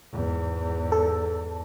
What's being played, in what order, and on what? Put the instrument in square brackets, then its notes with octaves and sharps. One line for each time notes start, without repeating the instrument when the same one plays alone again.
[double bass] E2 G#2
[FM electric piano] A4